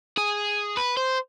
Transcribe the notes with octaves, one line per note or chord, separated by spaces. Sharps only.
G#4
B4
C5